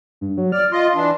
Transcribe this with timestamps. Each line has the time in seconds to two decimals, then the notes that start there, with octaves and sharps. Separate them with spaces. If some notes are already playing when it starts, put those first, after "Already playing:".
0.21 G2
0.38 F#3
0.52 D5 F6
0.72 F4 D#5 C6
0.95 E3 D4